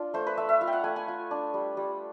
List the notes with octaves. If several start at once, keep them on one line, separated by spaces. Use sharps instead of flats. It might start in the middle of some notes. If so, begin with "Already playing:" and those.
Already playing: D4 F4
A3 C5
B4
A3 E5
E5
F4 F5
G5
F#5
A3 G#5
G#5
F4
D4
G3
G3